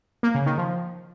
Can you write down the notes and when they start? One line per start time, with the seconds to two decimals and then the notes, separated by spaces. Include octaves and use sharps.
0.23 A#3
0.35 C#3
0.46 D#3
0.58 F3